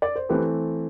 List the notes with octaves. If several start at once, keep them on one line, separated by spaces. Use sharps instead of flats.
D5
C5
E3 A3 C4 G4 B4